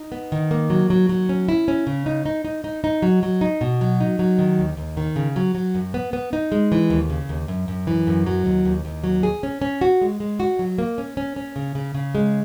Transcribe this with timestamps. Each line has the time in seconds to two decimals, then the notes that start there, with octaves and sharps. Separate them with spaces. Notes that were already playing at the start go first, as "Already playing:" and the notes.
Already playing: D#4
0.12 B3
0.32 D#3
0.51 A#3
0.70 F#3
0.90 F#3
1.09 F#3
1.29 C#4
1.49 E4
1.68 C#4
1.87 C#3
2.06 D#4
2.26 D#4
2.45 D#4
2.64 D#4
2.84 D#4
3.02 F#3
3.23 F#3
3.41 D#4
3.61 B2
3.81 F#3
4.01 D#4
4.19 F#3
4.39 D#3
4.59 D#2
4.77 D#2
4.97 D#3
5.16 C#3
5.36 F#3
5.55 F#3
5.75 F#2
5.94 B3
6.13 B3
6.33 D#4
6.52 G#3
6.72 E3
6.90 D#2
7.10 C#3
7.29 D#2
7.48 F#2
7.68 F#2
7.87 E3
8.07 F#2
8.26 F#3
8.46 D#2
8.65 D#2
8.85 D#2
9.04 F#3
9.23 G#4
9.43 C#4
9.62 C#4
9.81 F#4
10.01 G#3
10.20 G#3
10.40 F#4
10.59 F#3
10.78 A#3
10.98 C#4
11.17 C#4
11.36 C#4
11.56 C#3
11.75 C#3
11.95 C#3
12.15 G#3